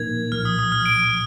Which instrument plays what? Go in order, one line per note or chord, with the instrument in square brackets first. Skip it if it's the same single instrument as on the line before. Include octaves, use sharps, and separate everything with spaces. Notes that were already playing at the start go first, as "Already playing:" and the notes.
Already playing: [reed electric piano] A#2 F3 A#3 D#4 A#4 [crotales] G#6
[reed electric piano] C2 A#2 F3 [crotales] F6
[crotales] D#6
D#6
F6
D7